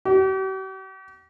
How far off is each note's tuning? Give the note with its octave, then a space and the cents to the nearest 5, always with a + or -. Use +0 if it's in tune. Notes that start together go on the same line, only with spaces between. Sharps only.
G4 -45